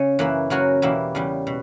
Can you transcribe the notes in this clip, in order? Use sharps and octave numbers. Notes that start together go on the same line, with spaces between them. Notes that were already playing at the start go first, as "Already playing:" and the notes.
Already playing: C#3 C#4
F#2 E3 A#3 E4
C#3 F#3 C#4 F#4 A#4
E2 B2 G3 A#3 E4
E2 C#3 G3
B2